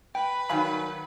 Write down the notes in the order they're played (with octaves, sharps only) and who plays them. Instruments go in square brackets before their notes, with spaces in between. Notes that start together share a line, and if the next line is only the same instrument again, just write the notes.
[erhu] B4 [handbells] G5
[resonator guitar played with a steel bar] G2 D#3 F#3 [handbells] F5 G#5 B5